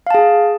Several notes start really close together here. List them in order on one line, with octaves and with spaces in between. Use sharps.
F5 A5 G#4